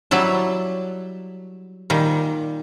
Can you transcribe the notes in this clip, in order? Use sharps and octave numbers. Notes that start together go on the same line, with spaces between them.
F#3 G3 E4 A5
A#2 D#3 G3